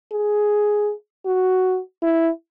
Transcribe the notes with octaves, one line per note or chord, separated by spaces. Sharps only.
G#4
F#4
E4